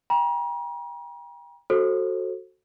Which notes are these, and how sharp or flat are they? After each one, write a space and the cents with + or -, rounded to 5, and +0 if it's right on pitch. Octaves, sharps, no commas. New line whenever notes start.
G5 +30 A#5 +40
F#4 +0 A4 +0 C5 +30